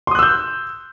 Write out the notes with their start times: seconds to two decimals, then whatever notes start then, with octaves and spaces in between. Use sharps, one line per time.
0.07 C6
0.11 D#6
0.15 F#6
0.19 E6
0.23 G6